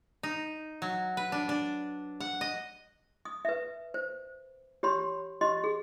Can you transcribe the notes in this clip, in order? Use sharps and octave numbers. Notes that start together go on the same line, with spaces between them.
D#4
F#3
B4
D4
D4
F#5
D#5
D#6
B4 E5
C5
G4 C#5 B5 C6
G4 D#5 C6
G#4